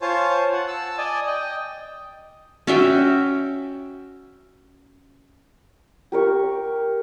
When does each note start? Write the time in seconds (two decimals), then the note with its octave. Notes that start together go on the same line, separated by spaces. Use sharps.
0.02 F4 C5 C#5 G#5 A5
0.53 F#5
0.68 A5 E6
0.98 D5 D#5 G#5
1.27 D#5 G5
2.67 C#4 F#4 E5 G5
6.12 G4 A#4 C#6